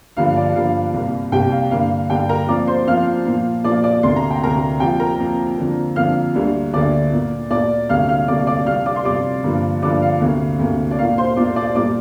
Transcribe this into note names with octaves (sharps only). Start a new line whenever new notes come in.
G2 D3 F3 A#3 F5
D5
G2 D3 F3 A#3 F5
C2 C3 G3 A#3
C2 C3 G3 A#3 G4 G5
F5
G2 D3 A#3 F5
G2 D3 A#3 G4 G5
A#4 A#5
F2 F3 A#3 D5 D6
C5 C6
F2 F3 A#3 F5 F6
A#2 F3 A#3
A#2 F3 A#3 D5 D6
D5 D6
D2 C3 A#3 C6
A#5
G5
D2 C3 A#3 A#4 A#5
F2 F3 A#3 G4 G5
A#4 A#5
F2 F3 A#3
F2 D3 F3 A#3
F2 D3 F3 A#3 F5 F6
D2 D3 G3 A#3
D2 D3 G3 A#3 D5 D6
A#2 A#3
A#2 A#3 D5 D6
D2 C3 G3 A#3 F5 F6
F5 F6
D2 C3 G3 A#3 D5 D6
D5 D6
F2 C3 G3 F5 F6
D5 D6
C6
F2 C3 G3 D5 D6
G2 D3 F3 A#3
G2 D3 F3 A#3 D5 D6
F5
D2 C3 A#3
D2 C3 A#3
D5
A#2 A#3 F5
C5 C6
A#2 A#3 D5 D6
D5 D6
A#2 G3 A#3 D5 D6